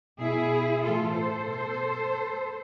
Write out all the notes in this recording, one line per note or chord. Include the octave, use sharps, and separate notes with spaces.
B2 E4 G#4
A2 E3 F4 A4
A4 C5
B2